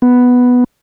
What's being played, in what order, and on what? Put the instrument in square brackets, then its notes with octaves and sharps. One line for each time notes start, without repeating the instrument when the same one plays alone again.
[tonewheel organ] B3